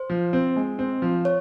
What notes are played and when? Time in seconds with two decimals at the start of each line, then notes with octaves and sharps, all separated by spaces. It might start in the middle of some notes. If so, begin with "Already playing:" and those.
Already playing: C5
0.10 F3
0.33 C4
0.56 G#3
0.79 C4
1.02 F3
1.25 C#5